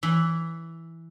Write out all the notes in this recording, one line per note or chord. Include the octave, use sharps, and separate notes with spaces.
E3